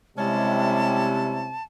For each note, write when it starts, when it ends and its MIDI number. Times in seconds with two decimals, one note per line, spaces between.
0.17 1.55 48
0.17 1.48 55
0.17 1.49 56
0.17 1.48 61
0.17 1.48 64
0.17 1.63 81